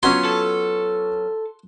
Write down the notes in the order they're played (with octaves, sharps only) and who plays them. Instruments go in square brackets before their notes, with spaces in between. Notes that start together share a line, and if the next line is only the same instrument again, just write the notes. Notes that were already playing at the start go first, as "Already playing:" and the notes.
[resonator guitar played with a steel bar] F#3 B3 C#4 [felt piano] F4 F#4 [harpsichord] C6
[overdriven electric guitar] A4